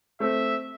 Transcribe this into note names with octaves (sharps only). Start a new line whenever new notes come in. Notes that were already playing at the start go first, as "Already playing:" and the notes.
A3 C4 E5